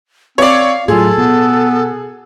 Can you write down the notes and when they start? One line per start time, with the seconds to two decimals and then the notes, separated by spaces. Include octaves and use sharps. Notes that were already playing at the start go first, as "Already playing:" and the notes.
0.38 C4 C#5 D5 F5
0.88 A2 F#3 F4 G#4 A4
1.17 B2 B3